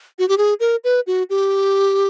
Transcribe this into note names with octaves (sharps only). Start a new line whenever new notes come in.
F#4
G4
G#4
A#4
B4
F#4
G4